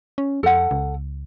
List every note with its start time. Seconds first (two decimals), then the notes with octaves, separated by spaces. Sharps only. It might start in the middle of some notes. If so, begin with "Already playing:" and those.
0.18 C#4
0.43 F2 A4 F#5
0.71 C#2